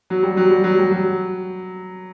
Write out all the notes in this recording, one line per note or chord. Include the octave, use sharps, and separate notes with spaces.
F#3
G3
F#3
G3
F#3
G3
F#3